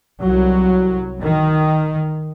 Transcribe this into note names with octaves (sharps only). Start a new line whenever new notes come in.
C2 F#3
D#3